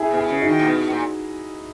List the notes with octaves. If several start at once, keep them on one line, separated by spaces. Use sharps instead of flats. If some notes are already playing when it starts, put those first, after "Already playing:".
Already playing: E4 G#4
B2
E4 G#4
C#3
D#4 F#4
D#3
A#2
B2
A#2